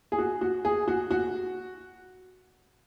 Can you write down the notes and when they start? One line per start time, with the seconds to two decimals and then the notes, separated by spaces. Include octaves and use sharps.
0.12 G#4
0.18 F#4
0.41 F#4
0.65 G#4
0.88 F#4
1.10 F#4